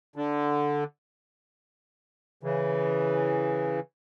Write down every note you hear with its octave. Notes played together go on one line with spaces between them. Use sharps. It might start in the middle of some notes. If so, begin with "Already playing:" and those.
D3
C#3 E3